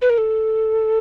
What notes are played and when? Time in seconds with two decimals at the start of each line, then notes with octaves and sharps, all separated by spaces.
0.02 B4
0.10 A#4
0.18 A4